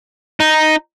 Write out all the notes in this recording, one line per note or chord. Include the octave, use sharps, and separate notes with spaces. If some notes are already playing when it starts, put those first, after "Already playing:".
D#4